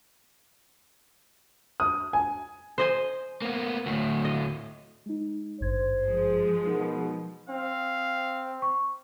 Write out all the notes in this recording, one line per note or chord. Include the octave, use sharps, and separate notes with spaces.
D#6
G#5
C5 D#5 G#5
A#3 B3
D2 A2
D#5
G#3 D#4
G#1 G2 C5 G#6
F3 G#3
B2 D#4 A#4
C4 F5
C#6